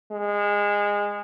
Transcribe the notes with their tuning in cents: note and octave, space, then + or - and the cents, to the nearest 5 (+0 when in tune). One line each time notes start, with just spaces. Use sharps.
G#3 -20